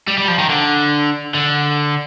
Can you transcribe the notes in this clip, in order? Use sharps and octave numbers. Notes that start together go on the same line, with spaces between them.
G3
G3
F3
D#3
D3
D3